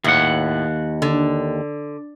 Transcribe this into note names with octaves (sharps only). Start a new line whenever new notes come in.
D#2 A2 F#5
D3